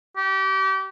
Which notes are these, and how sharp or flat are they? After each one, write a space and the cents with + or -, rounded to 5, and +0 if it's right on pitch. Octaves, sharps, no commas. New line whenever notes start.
G4 -30